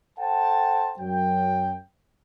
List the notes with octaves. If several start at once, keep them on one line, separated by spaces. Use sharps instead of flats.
A4 C5 F#5 G5 A5
F#2 F#3 G5